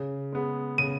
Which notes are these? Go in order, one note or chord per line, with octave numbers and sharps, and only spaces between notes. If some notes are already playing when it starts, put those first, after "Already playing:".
Already playing: C#3
G#3 B3
C#3 D#7